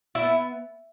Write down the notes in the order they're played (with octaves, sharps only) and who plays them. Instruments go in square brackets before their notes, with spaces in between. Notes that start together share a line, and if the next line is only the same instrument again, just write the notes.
[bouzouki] E4 E5
B3